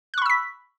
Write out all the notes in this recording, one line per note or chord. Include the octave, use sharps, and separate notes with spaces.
B5 C#6 E6 F#6 B6